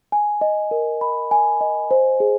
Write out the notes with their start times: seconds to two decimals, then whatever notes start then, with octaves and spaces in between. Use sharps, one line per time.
0.12 G#5
0.41 D#5
0.71 A#4
1.01 B5
1.31 G#5
1.61 D#5
1.91 C5
2.20 G#4